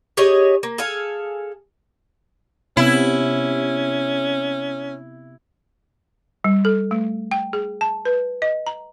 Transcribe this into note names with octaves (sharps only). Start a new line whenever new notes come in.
G4 G#4 C#5 D#5
A#3
G#4 A4 F5 G#5
C3 B3 C#4 E4
G3
A4
A3
G5
G#4
A5
B4
D#5
A#5